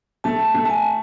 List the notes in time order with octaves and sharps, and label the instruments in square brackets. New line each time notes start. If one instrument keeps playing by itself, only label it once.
[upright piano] A3 [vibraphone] A5
[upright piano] A3
[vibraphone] A5
G#5